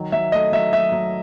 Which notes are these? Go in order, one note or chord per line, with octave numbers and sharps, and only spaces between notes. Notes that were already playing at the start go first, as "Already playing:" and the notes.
Already playing: D#3 F#3
F#3 E5
A3 D#5
F#3 E5
F#3 E5
F#3